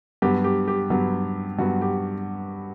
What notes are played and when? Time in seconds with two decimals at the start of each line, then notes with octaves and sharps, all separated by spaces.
0.22 G2 F#3 B3 G4
0.44 G4
0.68 G4
0.90 G2 F#3 B3
1.59 G2 F#3 B3 F#4
1.81 G4